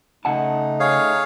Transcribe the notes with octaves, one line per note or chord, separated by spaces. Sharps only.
C#3 A3 D#4 F#5 A5
G#4 C#5 F5